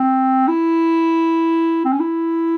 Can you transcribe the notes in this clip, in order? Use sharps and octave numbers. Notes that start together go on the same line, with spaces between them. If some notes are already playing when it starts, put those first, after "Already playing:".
Already playing: C4
E4
C4
C#4
E4